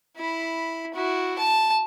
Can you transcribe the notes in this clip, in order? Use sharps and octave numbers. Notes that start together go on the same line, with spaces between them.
E4 B5
E4 F#4
A5